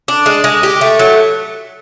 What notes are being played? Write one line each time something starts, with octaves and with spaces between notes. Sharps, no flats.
D4
G#3
G#3
G4
A3
F#3